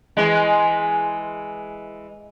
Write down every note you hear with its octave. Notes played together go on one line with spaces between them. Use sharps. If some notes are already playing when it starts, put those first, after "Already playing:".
E3 G#3